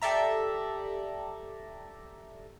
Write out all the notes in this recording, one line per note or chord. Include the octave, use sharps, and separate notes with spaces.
G4 A4 D5 E5 A#5